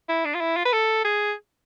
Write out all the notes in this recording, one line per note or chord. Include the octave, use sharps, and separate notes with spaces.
E4
D4
F4
E4
F4
B4
A4
G#4